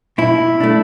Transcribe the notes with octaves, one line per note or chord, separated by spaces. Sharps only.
B2 E4
A3 D4